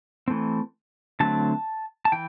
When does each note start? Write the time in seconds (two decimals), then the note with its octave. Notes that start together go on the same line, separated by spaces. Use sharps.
0.28 E3 A3 C4
1.20 D3 F#3 A3 C4 A5
2.05 A5
2.12 E3 G5